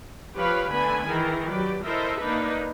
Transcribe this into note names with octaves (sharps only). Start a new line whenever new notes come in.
F3 G4 B4 C#5 F5 B5
D3 A3 B3 B4 G#5 B5
D#3 E3 G#4 A#4
F#3 G4 B4 D5
E4 A4 A#4 C5 D#5 E5
A#3 D4 D#4 B4